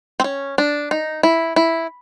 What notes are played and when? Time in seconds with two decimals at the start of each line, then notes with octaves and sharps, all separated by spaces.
0.20 C4
0.24 C#4
0.58 D4
0.91 D#4
1.23 E4
1.56 E4